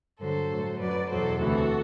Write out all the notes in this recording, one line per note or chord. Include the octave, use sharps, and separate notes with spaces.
G2 D3 F#3 A4 C5
A2 F#3
F#2 F#3 B4 D5
E2 B2 F#3 A4 C5
D2 C3 E3 F#4 A4